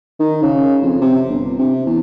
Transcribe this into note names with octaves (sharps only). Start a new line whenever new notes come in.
D#3
C#3
F2
C3
G1
C3
E2